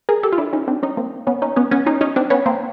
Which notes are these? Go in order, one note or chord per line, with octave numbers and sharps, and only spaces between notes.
G#4 A#4
G4 A4
F4
D4 E4
C#4 D#4
C4 D4
C#4 D#4
A#3 C4
B3 C#4
C#4 D#4
B3 C#4
B3 C#4
C#4 D#4
C#4 D#4
C4 D4
B3 C#4
A#3 C4